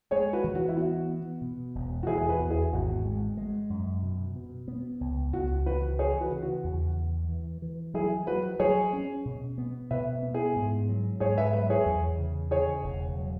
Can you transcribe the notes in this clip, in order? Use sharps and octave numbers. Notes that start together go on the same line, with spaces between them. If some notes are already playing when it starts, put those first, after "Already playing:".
G#3 G#4 C#5
F#4 B4
E3
F#4
E4
B3 F#4
B3
B2
E1
F#4
E2 E4 G#4
G#4
F#4 B4
E2
E4 G#4
G#1 F#4
G#3
G#3
F#2
B2
B2
B3
C#2
C#2 F#4
E3 F#4 B4
E3 G#4 C#5
F#4 B4
C#3
F#4
E2
E3
E3
E3
F#3 E4 G#4
F#3 F#4 B4
F#3 G#4 C#5
C#4
B2
B3
B2 B4 E5
B3
E4 G#4
G#2
F#3
G#2 G#4 C#5
B4 E5
F#3 B4 E5
G#4 C#5
E2
C#3
C#3 G#4 C#5
E1
F#3